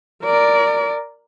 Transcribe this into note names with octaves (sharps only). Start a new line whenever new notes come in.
A#4 D5